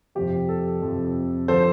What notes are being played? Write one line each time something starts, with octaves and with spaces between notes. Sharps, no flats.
F2 C3 F3 G4
A4
F2 C3 F3
D3 F3 A4 C5